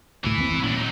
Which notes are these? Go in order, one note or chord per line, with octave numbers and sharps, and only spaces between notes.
D2 A2 E3 E4
D#2 A#3 C4
D#1
A#2 F#3 C#4 D4
F#3 D#4